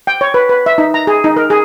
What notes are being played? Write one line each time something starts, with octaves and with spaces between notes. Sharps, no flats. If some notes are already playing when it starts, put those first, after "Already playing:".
G5
C#5
B4
B4
E5
D#4
A#5
G#4
D#4
A#4
G#4